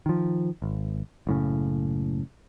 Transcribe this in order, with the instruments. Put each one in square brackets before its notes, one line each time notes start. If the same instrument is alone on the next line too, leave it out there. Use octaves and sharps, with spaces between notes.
[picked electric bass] D#3 F3
G#1
F#1 A2 C#3